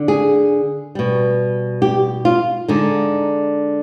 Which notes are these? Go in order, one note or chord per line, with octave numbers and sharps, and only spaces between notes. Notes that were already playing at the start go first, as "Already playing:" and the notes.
Already playing: D3
G#4
B2 G3
G4
F4
D3 G#3 D#4